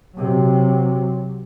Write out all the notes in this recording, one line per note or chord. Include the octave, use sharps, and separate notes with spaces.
C3 F#3